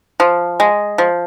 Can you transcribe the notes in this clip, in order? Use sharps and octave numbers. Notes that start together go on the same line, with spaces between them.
F3
G#3
F3